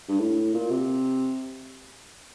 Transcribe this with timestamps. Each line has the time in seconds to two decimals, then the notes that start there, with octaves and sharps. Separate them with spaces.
0.08 G2
0.19 A2
0.54 A#2
0.70 C3